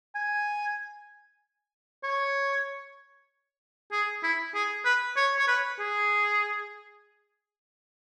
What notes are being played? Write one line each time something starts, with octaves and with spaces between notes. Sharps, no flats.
G#5
C#5
G#4
E4
G#4
B4
C#5
C#5
B4
G#4